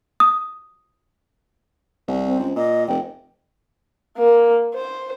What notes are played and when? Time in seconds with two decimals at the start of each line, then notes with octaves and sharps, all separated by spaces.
0.20 D#6
2.08 C2
2.26 C4
2.39 C#2
2.56 A#2 D#5
2.88 F1 G5
4.18 A#3
4.75 C5